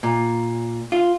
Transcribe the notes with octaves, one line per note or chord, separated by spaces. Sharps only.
A#2
F4